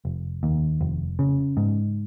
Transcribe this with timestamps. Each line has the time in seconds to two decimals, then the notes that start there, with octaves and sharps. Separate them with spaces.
0.05 F1
0.43 D#2
0.81 F1
1.19 C#3
1.57 G#2